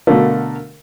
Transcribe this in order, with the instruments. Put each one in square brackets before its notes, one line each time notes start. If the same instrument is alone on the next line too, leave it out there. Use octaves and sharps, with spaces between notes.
[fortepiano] B2 D3 A3 [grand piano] A#4 F5